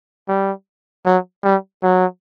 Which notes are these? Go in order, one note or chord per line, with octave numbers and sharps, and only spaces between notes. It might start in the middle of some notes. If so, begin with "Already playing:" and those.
G3
F#3
G3
F#3